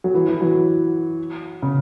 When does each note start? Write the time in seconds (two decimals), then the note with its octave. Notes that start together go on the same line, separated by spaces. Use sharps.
0.04 F#3
0.14 E3
0.29 E3
0.41 F#3
1.62 C#3